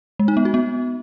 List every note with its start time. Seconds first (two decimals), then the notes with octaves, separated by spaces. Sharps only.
0.19 G#3
0.28 D#4
0.37 B3
0.45 F#4
0.54 B3